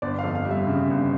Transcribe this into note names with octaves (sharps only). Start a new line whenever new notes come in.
G1 D5
F5
F2
F5
G3
E5
C#3
G1